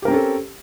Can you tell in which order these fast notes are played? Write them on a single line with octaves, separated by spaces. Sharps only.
G4 A#4 C4 C#4 A4